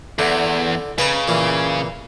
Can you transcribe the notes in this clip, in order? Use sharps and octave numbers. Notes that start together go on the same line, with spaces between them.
E2 D3
C#3 B4 D#5 A#5
A#2 E3